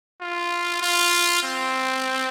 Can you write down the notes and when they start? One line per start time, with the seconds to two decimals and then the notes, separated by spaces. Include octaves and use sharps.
0.21 F4
0.81 F4
1.43 C4